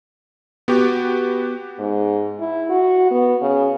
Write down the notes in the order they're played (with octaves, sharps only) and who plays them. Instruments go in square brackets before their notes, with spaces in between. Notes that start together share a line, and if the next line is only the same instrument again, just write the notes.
[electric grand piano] B3 F#4 G4
[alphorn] G#2
E4
F#4
B3
C#3